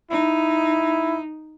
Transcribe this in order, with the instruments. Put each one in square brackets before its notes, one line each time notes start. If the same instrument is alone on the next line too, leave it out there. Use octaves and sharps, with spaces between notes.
[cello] D#4 [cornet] E4